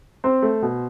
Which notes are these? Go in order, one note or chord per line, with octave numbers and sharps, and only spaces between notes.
C4 C5
A3
B2